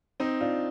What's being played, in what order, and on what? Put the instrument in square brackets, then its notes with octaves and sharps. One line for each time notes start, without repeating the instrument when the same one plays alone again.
[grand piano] C4 D#4
D4 F4